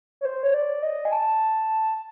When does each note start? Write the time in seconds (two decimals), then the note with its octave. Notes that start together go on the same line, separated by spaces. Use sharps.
0.21 C#5
0.25 C5
0.43 C#5
0.54 D5
0.82 D#5
1.05 G#5
1.12 A5